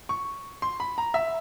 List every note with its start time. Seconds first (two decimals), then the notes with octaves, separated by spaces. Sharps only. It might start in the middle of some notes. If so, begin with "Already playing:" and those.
0.09 C#6
0.62 C6
0.80 B5
0.98 A#5
1.14 E5